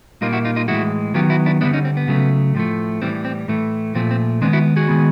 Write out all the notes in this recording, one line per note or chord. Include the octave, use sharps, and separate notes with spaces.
A#2 G3 A#3 D#4 F4
E4 F#4
D#4 F4
D#4 F4
A2 E3 G#3 E4 F#4
D#3 F#3 B3 F4 G4
E4 F#4
D4 E4
D3 G3 B3 D4 E4
C#4 D#4
C4
B3
C#3 F#3 A3
A2 F3 A3
A2 E3 G3 C4
C4
A2 E3 A3
A#2 F3 A3 C4
C4
D#3 G#3 B3 C4 D4
E4 F#4
F#4 G#4
D#3 G#3 B3